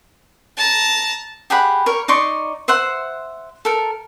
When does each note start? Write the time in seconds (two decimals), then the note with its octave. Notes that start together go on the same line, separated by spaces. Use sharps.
0.57 A5 A#5
1.50 G4 G#4 F#5 B5
1.86 A#4 C#5
2.08 D#4 D5 C6 C#6
2.68 C5 E5 F#5 C6
3.65 A4 A#4